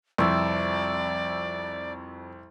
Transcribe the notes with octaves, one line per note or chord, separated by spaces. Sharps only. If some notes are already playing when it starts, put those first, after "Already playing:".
C2 F2 C5 D5 E5